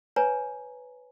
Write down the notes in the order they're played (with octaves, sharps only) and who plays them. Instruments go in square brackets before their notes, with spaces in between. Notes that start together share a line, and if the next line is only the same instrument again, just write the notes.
[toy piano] B4 C#5 G#5 A#5